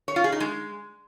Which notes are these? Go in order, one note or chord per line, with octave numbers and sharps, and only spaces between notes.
C#5
F4
G#4
D#4
G#3